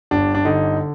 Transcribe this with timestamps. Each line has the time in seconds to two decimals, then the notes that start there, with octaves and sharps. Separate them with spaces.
0.11 G1 D4
0.35 D4
0.45 D3 D#4